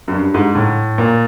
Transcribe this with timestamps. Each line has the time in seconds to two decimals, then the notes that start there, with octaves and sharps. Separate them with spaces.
0.08 F#2
0.13 G2
0.34 G#2
0.55 A2
0.98 A#2